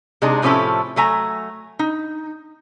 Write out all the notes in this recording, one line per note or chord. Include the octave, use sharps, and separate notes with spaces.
C3 G#3 D4 D#4 G#4
A2 C3 F3 C#4 E4 A4
F#3 A3 G#5 A#5
D#4